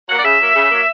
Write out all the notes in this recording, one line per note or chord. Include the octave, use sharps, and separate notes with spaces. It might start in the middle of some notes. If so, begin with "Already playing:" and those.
F#3 A#3 F#5
D5
C#3 E5
F#3 A#3
C#3
F#3 A#3